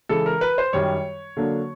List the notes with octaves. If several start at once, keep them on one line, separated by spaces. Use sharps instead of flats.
C#3 E3 G#3 A4
A#4
B4
C5
F#2 D#3 G3 C#5
D3 F#3 A#3 D4